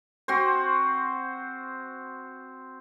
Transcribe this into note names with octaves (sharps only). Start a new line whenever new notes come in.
C4 F#4 C5